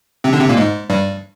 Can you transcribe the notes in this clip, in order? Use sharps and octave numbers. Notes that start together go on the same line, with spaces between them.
C3 C4
D3 D4
C3 C4
A#2 A#3
G#2 G#3
G2 G3